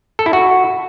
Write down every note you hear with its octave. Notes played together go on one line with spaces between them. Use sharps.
A4
E4
F#4